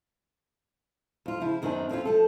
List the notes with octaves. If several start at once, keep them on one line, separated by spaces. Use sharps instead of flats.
F2 F4
C#3 F3 E4
F#2 D#3 B3 C4 D4 G#5
F2 C4 C#4 F4
F3 A3 A4